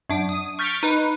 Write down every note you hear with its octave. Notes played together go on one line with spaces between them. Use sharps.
F#2 D4
D#6
C#6 F6 G6 A6 B6 D7
D#4 B4